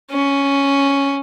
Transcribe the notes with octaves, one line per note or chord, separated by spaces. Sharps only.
C#4